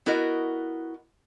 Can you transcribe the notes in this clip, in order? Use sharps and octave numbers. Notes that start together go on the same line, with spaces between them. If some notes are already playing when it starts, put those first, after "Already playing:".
B3 E4 F#4 A#4 D#5